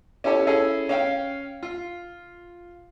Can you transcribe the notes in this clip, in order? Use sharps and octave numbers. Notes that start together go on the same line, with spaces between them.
C#4 E4 G4 A4 C#5
C#4 E4 G#4 A4
C#4 F5 G5
F4